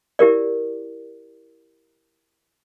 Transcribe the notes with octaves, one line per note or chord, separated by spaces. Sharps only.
E4 G4 A#4 D5